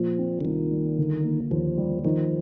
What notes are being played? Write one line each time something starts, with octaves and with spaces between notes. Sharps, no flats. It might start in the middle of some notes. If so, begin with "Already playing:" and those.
Already playing: A#2 F3
C4
D3
C2 D#3
G3
D3
A#3
D#2 F3
G3
D#3 F3